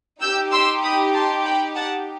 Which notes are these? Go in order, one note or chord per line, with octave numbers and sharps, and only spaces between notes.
D#4 G4 E6 G6
C6 E6
B5 D#6
A5 C6
G5 B5
F#5 A5